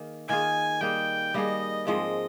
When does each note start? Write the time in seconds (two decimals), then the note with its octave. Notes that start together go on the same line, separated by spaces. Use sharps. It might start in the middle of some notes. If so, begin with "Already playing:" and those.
Already playing: D#3 A#3 G#4
0.28 D#3 A#3 F4 G#4 G#5
0.81 G3 A#3 D#4 G#4 G5
1.34 G3 A#3 D#4 G#4 D#5
1.87 G#2 F3 G#3 C4 D#5